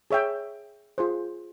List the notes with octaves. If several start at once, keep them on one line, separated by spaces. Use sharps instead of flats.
G#4 C#5 E5 G5
F4 G#4 C5